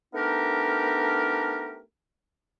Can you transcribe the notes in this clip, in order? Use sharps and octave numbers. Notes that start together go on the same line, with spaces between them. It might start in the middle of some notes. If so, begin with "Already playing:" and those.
A3 B3 D4 D#4 G4 A#4